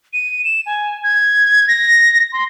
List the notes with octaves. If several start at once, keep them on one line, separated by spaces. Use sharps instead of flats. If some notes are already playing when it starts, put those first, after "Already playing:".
D#7
E7
G#5
G#6
A#6
C6